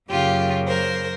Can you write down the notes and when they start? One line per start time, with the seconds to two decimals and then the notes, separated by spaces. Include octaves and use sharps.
0.10 F#2 C#3 F#3 A#3 F4 G4
0.67 A#4 C5